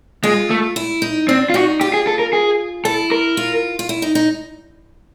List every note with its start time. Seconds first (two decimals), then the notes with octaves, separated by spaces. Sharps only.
0.23 G#3 F4
0.50 A3
0.76 E4
1.02 D#4
1.28 C4 D4
1.50 F4
1.54 D#4 F#4
1.81 F4 G4
1.94 G#4
2.07 A4
2.19 A#4
2.33 G#4
2.85 E4 A4
3.12 A#4
3.37 F4
3.79 F4
3.89 E4
4.02 D#4
4.15 D#4